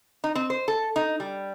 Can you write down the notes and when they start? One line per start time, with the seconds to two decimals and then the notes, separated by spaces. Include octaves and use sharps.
0.24 D#4
0.35 C4
0.50 C5
0.68 A4
0.96 D#4
1.20 G3